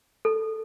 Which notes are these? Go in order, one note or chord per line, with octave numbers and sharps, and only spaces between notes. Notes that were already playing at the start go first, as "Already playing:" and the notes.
A4